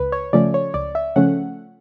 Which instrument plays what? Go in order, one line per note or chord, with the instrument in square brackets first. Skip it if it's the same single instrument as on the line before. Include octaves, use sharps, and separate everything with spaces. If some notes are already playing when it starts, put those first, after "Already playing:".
Already playing: [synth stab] C#2 B4
C#5
C#3 F3 A3 C#4 D5
C#5
C#2 D5
E5
C#3 F3 A3 C#4 F#5